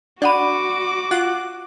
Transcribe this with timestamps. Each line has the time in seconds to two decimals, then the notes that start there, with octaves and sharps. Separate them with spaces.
0.22 D4 F#4 D5 F#5 B5 D6 D#7
1.11 F4 F#5 F#6